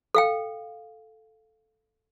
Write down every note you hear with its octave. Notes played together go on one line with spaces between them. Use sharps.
A4 F5 G5